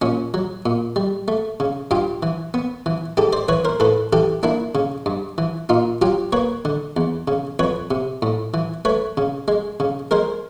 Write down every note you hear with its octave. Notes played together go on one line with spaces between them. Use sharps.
A#2 C#4
F#3
A#2
G3
A3
C#3
G2 F4 G4
E3
B3
E3
G#2 G4 A4
C5 D5
E3 B4 C#5
A#4 C5
A2 A4 B4
E3 G4 A4
A#3 D4 E4
C#3
G2
E3
A#2 D#4 F4
F#3 F4 G4
A#3 B4 C#5
D3
E2
C#3
F2 B4 C#5
C3
A2
E3
A3 B4 C#5
C#3
G#3
C#3
G#3 A#4 C5